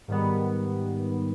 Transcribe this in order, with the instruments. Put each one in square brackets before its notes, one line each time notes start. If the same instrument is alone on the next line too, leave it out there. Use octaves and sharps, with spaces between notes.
[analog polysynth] G#2 D#3 G3 B3